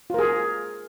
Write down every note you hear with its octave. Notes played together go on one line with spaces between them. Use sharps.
F4 G#4 A#4